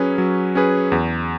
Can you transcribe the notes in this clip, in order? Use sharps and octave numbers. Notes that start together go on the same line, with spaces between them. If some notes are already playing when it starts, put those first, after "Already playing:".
Already playing: F#3 C#4 G#4 B4
F#3
C#4 G#4 B4
E2